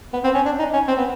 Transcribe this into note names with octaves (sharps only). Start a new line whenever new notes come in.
B3
C4
C#4
D4
D#4
C#4
C4
B3